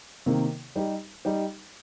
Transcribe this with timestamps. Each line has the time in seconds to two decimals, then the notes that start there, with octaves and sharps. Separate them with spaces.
0.26 C3 D#3 A#3
0.75 G3 D#4 G4
1.25 G3 D#4 G4